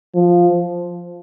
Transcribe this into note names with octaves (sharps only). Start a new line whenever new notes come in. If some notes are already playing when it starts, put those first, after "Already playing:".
F3